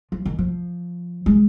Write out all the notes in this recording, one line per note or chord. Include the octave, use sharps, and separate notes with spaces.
F3
D#3
F3
G#3